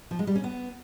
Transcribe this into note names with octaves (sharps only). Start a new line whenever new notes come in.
F3
G#3
G3
C#4
B3